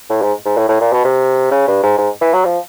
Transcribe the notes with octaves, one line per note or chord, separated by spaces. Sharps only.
A2
G#2
G#2
A2
A2
A#2
B2
C3
C#3
G2
G#2
G#2
E3
F#3
F3